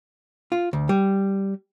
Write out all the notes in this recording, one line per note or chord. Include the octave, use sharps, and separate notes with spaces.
F4
D2
G3